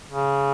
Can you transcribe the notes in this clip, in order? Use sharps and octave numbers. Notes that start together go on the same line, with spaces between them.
C#3